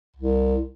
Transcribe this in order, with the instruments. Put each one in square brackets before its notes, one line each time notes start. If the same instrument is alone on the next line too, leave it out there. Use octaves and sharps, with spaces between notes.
[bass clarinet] C2